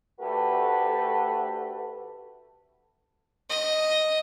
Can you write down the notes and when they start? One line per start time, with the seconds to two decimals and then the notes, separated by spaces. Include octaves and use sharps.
0.20 D2 A3 F#4 G4 A4 B4
3.50 D#5